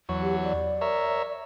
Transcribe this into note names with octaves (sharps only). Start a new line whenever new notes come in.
E2 F#3 C#5
G4
D5
A#4 C#5 E5